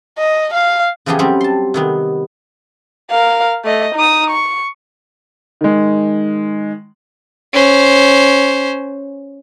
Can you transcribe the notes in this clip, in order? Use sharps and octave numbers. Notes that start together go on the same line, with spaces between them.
D#5
F5
C#3 E3 F3 B3 G4 G#4
F#3 G3 C4 C#4 G4
A5 C6
C3 D#3 B3
A#4 F5
A3 D#5
D#4 D#6
C#6
D#3 G#3
C#4 C5